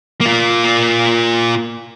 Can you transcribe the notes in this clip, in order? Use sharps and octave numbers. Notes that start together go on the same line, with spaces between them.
A#3 F4